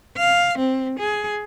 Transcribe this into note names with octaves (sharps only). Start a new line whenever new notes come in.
F5
C4
G#4